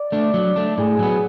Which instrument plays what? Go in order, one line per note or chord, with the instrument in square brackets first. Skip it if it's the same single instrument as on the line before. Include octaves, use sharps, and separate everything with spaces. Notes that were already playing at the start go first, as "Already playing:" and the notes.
Already playing: [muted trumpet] D5
[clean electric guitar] A3 D4
F#3
A3 D4
[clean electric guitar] A2 [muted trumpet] G#4
[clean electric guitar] F#3 B3